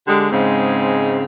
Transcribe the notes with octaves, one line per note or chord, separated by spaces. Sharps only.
D3 G#3 G4
G#2 C#3 G#3 C4